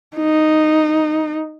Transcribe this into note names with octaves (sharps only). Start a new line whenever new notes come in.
D#4